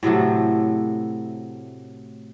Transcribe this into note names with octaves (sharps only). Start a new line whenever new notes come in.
A2 C3 F#3 A3